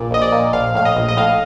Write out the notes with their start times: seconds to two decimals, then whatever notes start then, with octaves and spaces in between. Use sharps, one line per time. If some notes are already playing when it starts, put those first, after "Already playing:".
Already playing: A#1 A#2 D5
0.11 A#1 D#5
0.22 D5
0.32 A#2
0.53 A#1 F5
0.75 A2 F5
0.85 D#5
0.96 A#1
1.08 D#5
1.17 A2 F5